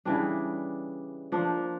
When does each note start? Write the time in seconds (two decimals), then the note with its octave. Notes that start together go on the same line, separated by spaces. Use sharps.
0.05 C#3 E3 G3 D4
1.32 F3 A#3 D4